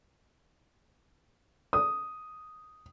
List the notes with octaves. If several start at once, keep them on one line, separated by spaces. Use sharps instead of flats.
D#6